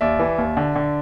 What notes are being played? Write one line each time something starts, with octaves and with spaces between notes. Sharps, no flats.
D#2 D5 E5
E3
D#2
D3
D3